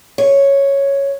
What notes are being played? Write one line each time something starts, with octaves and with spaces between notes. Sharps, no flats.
C#5